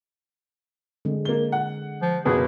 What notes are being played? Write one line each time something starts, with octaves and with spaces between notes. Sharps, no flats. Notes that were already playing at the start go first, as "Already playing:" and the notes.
D3 G#3 C4
A#3 G7
F#5
F3
F#1 B2 G#4 B4